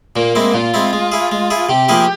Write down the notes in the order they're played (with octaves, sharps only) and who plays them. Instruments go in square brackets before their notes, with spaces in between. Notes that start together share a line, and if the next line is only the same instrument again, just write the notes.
[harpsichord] A#2 [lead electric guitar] A#3
[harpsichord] G#3 C4 E4
[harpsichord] A#2 [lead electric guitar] F4
[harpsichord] G#3 C4 E4
G#3
E4 G#4
G#3
E4 G#4
[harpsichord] C3 [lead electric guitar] G4
[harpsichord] F3 A#3 E4 G#4